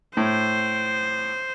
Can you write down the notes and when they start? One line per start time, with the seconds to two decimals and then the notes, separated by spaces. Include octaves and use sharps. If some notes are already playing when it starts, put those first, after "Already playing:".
0.17 A2 C5